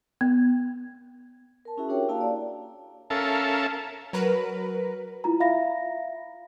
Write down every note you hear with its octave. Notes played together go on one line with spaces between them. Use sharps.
B3
A#4 A5
C#4 E4 F#4 G#4 E5
D4 F#4 G4 A#4 C#5 G5
A#3 E4 F5 A5 A#5
D5
C#4 A4 A#4 E5 F5 A5
F#3 A#4 B4
E4 F4 A#5
E5 F5 B5 A#6